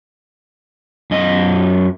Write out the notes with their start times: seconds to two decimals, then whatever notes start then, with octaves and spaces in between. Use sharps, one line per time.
1.11 F#2 D#5